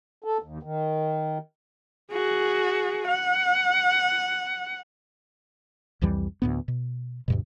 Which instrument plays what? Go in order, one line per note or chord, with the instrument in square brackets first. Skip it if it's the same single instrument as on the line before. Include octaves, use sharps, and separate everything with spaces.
[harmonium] A4
D#2
D#3
[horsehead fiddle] F#4 G#4
F#5
[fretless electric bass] C2 F2 E3 G3
D2 A2 B3
B2
D2 G2 B2